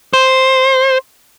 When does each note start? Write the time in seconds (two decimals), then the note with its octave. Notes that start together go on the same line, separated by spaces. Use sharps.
0.13 C5